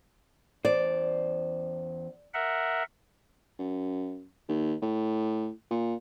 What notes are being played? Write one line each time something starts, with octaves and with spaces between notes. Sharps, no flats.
E2 C5 D5
A#4 E5 F#5
F#2
D#2
A2
A#2